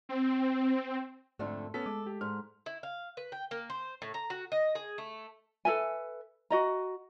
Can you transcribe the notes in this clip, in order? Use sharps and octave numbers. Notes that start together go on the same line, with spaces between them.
C4
F2 G#2 D3 A3
B3 C#4 A4 B6
G#3 D6
G4
G#2 F6
E4
F5
B4
G5
A#3
C5
A2
A#5
F#4
D#5
G#4
A3
A4 B4 E5 G#5
F#4 D#5 A#5